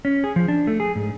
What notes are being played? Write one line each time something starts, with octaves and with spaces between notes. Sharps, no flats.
C#4
G#4
F3
D4
A3
G#4
G#2